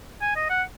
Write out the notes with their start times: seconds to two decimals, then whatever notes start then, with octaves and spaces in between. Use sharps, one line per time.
0.21 G#5
0.36 D#5
0.50 F#5